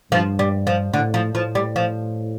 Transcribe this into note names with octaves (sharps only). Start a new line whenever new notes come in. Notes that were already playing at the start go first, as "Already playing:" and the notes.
G2 F3
G3
F3
A2 D3
F3
A2 F3
G3
F3